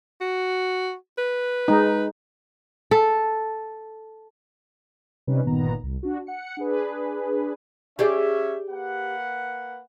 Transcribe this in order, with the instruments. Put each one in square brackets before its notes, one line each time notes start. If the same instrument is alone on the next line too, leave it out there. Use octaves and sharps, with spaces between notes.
[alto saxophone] F#4
B4
[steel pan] G#3 D#4
[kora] A4
[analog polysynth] C3 G3 C#4 D#4 B4
G1 A#2 D#3 B3 A#5
C2
D4 F#4
F#5 C#7
D4 G#4 B4
[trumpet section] C#4 E5 [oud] G4 G#4 D5
[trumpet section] A#3 B4 F#5